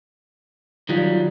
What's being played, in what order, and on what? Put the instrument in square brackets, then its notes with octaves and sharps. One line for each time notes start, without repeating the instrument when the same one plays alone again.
[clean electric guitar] D#3 F#3 G3 [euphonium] F4